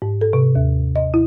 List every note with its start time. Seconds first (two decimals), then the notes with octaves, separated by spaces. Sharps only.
0.02 G#2
0.21 A4
0.33 C3
0.55 D#2
0.96 D#5
1.14 E4